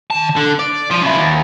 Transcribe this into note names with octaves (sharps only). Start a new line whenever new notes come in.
D#3 A5
D3
D5
F3
C#3 E4
D#2